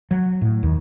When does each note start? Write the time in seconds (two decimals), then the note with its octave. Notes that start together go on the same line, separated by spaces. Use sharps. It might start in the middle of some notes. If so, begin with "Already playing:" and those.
0.11 F#3
0.41 A2
0.63 D#2